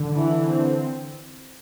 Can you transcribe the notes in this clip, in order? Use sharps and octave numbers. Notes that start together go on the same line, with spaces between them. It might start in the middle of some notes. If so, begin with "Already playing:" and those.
Already playing: D3
E3 E4
C4